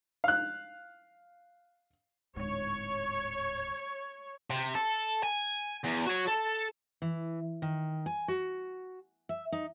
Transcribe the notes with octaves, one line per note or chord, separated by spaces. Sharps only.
F5 F#6
D1 G#2 C#5
C3
A4
G#5
E2
F#4 C#5
A4
E3
D#3
G#5
F#4
E5
D#4